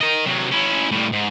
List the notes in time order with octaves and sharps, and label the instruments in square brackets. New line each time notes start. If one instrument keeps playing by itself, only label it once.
[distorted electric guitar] A#4 D#5
C3 F#3
C#4 E4
A2 G3
G#2